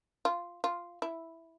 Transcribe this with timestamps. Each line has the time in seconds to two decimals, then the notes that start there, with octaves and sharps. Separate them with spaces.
0.25 F4
0.64 F4
1.02 E4